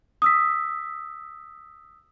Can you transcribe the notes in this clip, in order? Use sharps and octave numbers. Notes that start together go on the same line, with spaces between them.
D#6 E6 B6